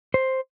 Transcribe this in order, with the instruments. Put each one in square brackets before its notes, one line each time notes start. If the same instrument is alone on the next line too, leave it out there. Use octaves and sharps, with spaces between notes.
[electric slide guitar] C5